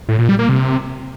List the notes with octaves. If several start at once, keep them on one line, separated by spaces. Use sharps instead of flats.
A2
A#2
G3
A#3
C3